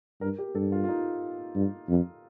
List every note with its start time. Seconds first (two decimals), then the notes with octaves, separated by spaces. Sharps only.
0.21 G2 A#4
0.38 G4
0.55 G2 A4
0.72 F4
0.84 F4
0.88 D#4
1.55 G2
1.89 F2